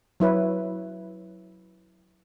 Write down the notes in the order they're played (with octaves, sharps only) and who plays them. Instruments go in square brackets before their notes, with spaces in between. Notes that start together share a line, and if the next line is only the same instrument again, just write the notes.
[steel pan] F#3 E4 B4 C#5